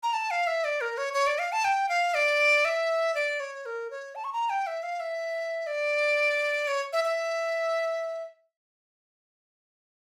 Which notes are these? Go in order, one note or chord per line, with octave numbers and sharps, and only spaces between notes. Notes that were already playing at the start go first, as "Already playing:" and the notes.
A#5
A5
F5
E5
D5
A#4
C#5
C#5
D5
F5
A5
G5
F5
D5
E5
D5
C#5
A#4
C#5
A5
C#6
A#5
G5
E5
F5
E5
D5
C#5
E5
E5